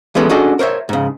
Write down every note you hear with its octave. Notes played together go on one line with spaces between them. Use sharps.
E3 G3 G#3 B3 C#4 A4
C#4 D4 F#4 G#4 A4 D#5
A#4 C5 C#5 E5
G#2 C#3